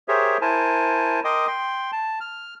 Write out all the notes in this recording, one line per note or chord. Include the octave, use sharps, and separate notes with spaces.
G4 G#4 A#4 C5 C#5 E5
E4 A#4 C5 G#5 A5
A#4 D#5 G5 C6 D6 D#6
G5 C6
A5
F6